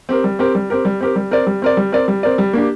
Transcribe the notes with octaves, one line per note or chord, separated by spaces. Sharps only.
C4 G4 A#4
G3
C4 G4 A#4
G3
C4 G4 A#4
G3
C4 G4 A#4
G3
C4 A#4 D5
G3
C4 A#4 D5
G3
C4 A#4 D5
G3
C4 A#4 D5
G3
A#3 D4 G4